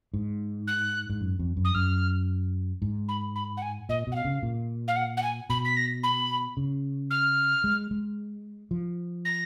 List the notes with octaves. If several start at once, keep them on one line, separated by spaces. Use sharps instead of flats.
G#2
F#6
G#2
F#2
F2
F#2
D#6
F#2 F6
G#2
B5
B5
F#5
G#5
A#2 D#5
B2 F#5
F5
C#3
A#2
F5
F#5
F#5
G#5
B2 B5
B6
A#6
B5
C#3
F6
G#3
G#3
F3
A#6